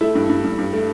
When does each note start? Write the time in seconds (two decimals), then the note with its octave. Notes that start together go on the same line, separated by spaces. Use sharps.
0.01 A3 E4
0.15 G2
0.29 G2
0.44 G2
0.58 G2
0.73 A3